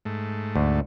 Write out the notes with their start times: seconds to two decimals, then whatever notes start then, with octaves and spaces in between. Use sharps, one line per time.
0.05 G#2 A3
0.56 D2